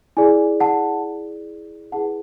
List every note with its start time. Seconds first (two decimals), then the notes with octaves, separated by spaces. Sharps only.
0.17 E4 G#4 D5 G#5
0.60 F#5 A5
1.92 E4 G#4 B4 F#5 A5